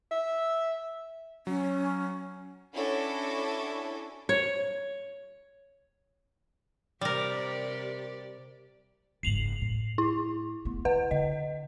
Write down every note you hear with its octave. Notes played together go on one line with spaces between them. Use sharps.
E5
F#3 C#4
C#4 D4 E4 F#4 A4
C#5
C3 G3 G4 A#4 D5
F#1 G#2 C7 F7 F#7
A2
E4
A3 B3
D#3 B4 F#5
D3 D#5